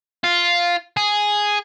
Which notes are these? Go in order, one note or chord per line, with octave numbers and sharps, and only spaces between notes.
F4
G#4